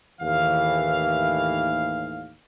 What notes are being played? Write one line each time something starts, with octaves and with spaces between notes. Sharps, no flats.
D#2 A2 E3 F5